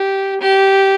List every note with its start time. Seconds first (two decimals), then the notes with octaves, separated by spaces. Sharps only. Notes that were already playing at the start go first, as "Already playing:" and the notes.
Already playing: G4
0.41 G4